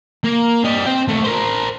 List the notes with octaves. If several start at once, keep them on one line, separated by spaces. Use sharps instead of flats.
A#3
G3 D#5
C4 G5
D#2 A3
A#4 C5